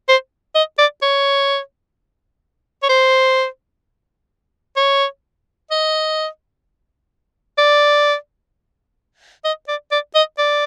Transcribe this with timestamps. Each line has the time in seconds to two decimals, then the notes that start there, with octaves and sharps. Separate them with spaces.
0.09 C5
0.55 D#5
0.79 D5
1.02 C#5
2.83 C#5
2.89 C5
4.77 C#5
5.71 D#5
7.58 D5
9.45 D#5
9.68 D5
9.92 D5
10.15 D#5
10.38 D5